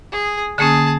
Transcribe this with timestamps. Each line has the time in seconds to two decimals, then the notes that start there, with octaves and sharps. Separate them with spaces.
0.12 G#4
0.58 D3 A#3 C#4 G#4 A5